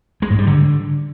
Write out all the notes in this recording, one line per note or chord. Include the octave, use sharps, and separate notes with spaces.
G#3
G#2
G3
D3